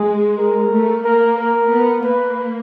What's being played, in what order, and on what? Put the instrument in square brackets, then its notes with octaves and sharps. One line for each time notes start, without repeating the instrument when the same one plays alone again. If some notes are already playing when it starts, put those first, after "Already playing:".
Already playing: [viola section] G#3 [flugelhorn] G#4
[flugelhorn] A#4
[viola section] A3
[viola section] A#3 [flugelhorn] A#4
[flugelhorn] A#4
[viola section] B3
[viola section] A#3 [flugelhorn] B4